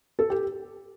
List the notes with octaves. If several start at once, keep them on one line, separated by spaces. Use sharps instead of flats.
A4
G4